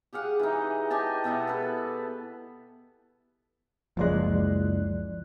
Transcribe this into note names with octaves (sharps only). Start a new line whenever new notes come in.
G4 G#4 F5 F#5
E3 D#4
G4 D#5 G#5 A5
B2 B3 E4 F#5
A4 B4
F#1 C#2 F3 G#3 D5 F#6